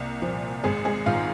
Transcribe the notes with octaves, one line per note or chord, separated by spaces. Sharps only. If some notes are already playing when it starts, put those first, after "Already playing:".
Already playing: C2 A#3
A#2 F3
G#1 G#3 G#4
G#3 G#4
G#2 D#3 F4 F5